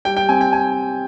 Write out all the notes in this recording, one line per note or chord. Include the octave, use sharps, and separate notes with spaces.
G3 G5
G5
C4 G#5
G5
G#5